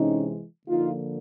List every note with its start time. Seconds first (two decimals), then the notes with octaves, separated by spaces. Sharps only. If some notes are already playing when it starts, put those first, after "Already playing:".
Already playing: C3 E3 G#3 C#4 D#4
0.67 D3 F3 A#3 D#4 F4